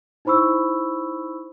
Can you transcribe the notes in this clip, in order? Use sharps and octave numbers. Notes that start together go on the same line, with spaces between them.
D#4 E4 C5 B5 C#6 E6